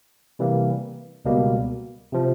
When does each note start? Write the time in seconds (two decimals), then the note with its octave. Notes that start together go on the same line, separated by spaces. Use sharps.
0.39 C3 E3 G3 A#3
1.25 C#2 B2 G3 A#3
2.12 C3 F3